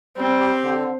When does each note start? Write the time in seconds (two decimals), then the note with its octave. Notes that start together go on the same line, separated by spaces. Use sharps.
0.17 G3 C4
0.40 G4
0.64 D3